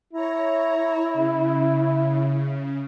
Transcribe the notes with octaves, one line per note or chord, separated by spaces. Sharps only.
E4 C#5 A#5
C#3